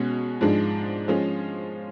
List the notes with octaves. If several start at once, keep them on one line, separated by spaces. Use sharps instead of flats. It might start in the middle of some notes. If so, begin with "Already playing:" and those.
Already playing: B2 G#3 C#4 F#4
G#2 F3 G#3 D4
F3 G#3 C#4